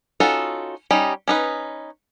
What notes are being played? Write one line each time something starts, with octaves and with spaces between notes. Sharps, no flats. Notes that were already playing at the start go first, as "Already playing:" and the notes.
C#4 D#4 F4 F#4 A4
G3 C#4 D#4
C#4 D#4 B4